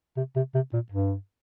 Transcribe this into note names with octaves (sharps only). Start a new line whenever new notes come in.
C3
C3
C3
A#2
G2